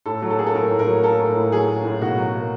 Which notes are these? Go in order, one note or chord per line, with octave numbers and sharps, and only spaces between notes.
A2 A4
F#3
A4
A#3 G#4
A4
A2 A#4
A2
A#4
F#3
A#3 A4
A2
A2
F#3 G#4
A#3
A2
B2 F#4
F#3
A#3